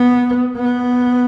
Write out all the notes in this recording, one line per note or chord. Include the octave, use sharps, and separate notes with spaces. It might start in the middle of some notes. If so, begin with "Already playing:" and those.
Already playing: B3
B3